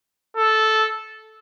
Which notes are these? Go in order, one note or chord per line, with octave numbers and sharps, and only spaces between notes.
A4